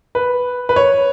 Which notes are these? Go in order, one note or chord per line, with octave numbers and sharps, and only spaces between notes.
B4
B4
C#5